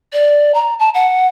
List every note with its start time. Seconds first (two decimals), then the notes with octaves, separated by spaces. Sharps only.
0.13 D5
0.54 A#5
0.79 A5
0.94 F#5